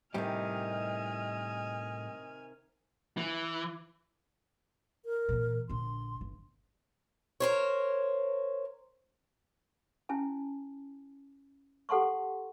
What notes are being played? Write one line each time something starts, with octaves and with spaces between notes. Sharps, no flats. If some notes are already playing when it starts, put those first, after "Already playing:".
A2 C3 D#3 G3 G4 D#5 G#5 F6
E3
A#4
A#2 E3
A#1 D3 C6
G1
A#4 C5 C#5
C#4 E4 G#5 A5
G4 A4 F#5 A5 C6 C#6